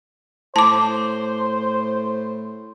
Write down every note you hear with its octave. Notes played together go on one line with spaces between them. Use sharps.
A2 C5 A5 D6